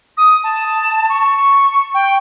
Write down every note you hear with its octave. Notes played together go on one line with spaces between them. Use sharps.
D#6
A5
C#6
G5